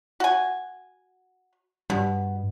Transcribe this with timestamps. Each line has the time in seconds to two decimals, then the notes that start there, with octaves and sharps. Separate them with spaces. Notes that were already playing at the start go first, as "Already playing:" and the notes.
0.20 F#4 G#5
1.90 G2 B2